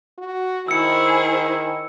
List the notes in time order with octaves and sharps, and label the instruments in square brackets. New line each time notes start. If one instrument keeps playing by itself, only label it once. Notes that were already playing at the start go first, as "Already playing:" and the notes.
[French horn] F#4
[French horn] D#3 [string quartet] E4 G#4 C5 [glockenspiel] E6 C#7